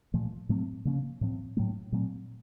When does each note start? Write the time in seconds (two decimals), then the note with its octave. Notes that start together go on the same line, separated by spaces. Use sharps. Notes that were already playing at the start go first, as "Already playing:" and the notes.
0.14 A#2 F3 A3
0.49 A2 F#3 A3 C4
0.85 C#3 F3 A#3 C#4
1.21 A2 F3 C4
1.57 A2 F#3 A3
1.92 A#2 F#3 A3 C4